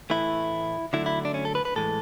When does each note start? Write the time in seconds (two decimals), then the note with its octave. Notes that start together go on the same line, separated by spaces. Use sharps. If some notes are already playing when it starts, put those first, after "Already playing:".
0.10 A2 E3 A3 E4
0.93 D3 F#3 A3 E4
1.06 E4
1.25 D4
1.34 C#4
1.45 A4
1.55 B4
1.65 B4
1.76 A2 E3 G#3 A4